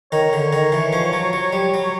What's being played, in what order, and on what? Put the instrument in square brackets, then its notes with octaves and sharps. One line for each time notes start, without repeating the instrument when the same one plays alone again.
[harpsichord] D#3 [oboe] C#5
[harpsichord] D3
D#3
E3
F3
F#3
F#3
G3
F#3